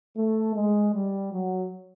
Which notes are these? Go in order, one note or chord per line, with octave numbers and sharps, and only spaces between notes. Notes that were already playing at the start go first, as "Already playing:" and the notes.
A3
G#3
G3
F#3